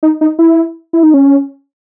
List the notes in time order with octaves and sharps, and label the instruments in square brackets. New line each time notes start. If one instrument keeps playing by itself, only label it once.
[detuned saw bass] D#4
D#4
E4
E4
D#4
C#4